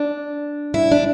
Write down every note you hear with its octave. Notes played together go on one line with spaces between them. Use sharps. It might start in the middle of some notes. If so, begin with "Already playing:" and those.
Already playing: D4
E4
D4